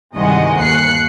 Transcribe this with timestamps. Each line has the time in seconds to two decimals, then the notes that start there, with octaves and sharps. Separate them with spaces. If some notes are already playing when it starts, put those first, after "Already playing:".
0.16 G1 C2 D#3 G#3 D#5 F#5
0.59 D#2 F#6 C7 C#7